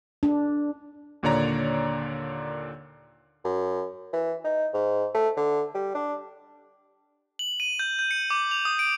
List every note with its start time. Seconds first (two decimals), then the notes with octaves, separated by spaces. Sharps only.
0.23 D4
1.23 D#2 A#2 D3 C#5 D5 A#5
3.45 F#2
4.13 E3
4.44 D#4
4.74 G#2
5.15 A3
5.37 D3
5.74 G3
5.95 D4
7.39 F#7
7.60 D#7
7.79 G6
7.99 G6
8.11 C#7
8.30 D6
8.51 F7
8.65 D#6
8.79 D7